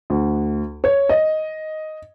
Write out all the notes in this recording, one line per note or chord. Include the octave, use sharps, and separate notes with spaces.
D2
C#5
D#5